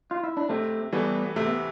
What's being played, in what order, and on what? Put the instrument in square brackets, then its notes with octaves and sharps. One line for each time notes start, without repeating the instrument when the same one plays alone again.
[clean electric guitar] F4
E4
D4
[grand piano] C3 [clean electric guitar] A3 C4
[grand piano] E3 A3 [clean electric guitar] G3 B3
[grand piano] C3 [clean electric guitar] A3
[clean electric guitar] B3